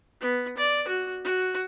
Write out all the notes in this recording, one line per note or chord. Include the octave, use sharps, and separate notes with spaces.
B3
D5
F#4
F#4